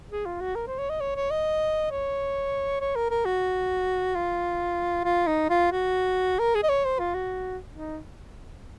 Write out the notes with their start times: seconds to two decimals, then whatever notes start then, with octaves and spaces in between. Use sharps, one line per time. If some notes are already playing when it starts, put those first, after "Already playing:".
0.11 G#4
0.26 F4
0.40 F#4
0.55 A#4
0.67 C5
0.78 C#5
0.90 D#5
1.01 C#5
1.16 C#5
1.30 D#5
1.91 C#5
2.81 C#5
2.95 A#4
3.10 A#4
3.25 F#4
4.15 F4
5.04 F4
5.27 D#4
5.49 F4
5.72 F#4
6.39 A#4
6.55 G#4
6.63 D#5
6.69 C#5
6.85 C5
6.99 F4
7.14 F#4
7.74 D#4